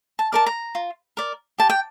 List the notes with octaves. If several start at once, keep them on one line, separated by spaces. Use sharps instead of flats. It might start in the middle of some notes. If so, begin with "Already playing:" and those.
A5
A#4 D5 A5
A#5
F4
A#4 D5
G4 A5
G5